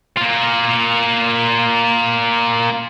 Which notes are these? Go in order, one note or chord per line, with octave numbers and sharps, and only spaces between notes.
A#3 F4